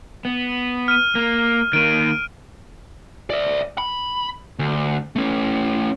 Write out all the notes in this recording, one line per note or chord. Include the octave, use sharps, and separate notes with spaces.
B3
F6 D#7
A#3
D#3 A#3 D7 D#7
D5 E5
B5
D2
A3 C#4